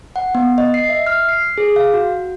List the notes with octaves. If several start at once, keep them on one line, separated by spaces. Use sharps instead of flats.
F#5
B3
D#5
C7
E5
F6
C7
G#4
F5
F#4